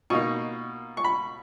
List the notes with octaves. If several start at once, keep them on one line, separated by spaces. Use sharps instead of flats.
B2 A#3 D#4 C#6
C#6
B5